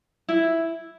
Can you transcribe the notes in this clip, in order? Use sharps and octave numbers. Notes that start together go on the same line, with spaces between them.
E4